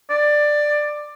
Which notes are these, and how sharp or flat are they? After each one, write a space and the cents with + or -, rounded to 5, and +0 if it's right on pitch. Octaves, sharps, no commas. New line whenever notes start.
D5 +10